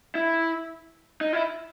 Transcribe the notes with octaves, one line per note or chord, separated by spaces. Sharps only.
E4
D#4
E4